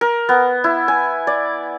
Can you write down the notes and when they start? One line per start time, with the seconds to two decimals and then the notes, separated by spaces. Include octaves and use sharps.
0.01 A#4
0.29 B3
0.64 E4
0.88 G#5
1.27 D5